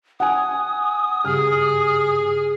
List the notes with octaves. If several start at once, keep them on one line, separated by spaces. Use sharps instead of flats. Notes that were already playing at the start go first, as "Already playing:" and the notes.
F#5 G#5 D#6
G2 C#3 G4 G#4 F6